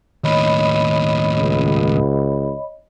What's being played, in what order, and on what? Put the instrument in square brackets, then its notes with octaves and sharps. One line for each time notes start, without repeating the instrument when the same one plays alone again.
[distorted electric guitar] D#2 A2 [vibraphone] C#5 D#5 B5
[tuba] C#2